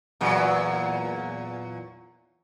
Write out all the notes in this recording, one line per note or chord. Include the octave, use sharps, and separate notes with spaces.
E2 A#2 F#3